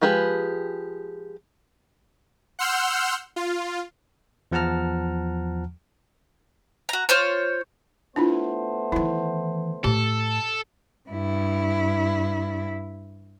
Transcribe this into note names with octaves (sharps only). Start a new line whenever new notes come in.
F3 G#3 G4 G#4 B4
F#5 C6 E6 F6 G6
F4
E2 F3 F#5 A5 A#5 F6
F#4 A#5
F4 C5 C#5
A3 B3 D4 E4 F4 C5
D#3 E3 E4
A2 G4 A4
G2 E4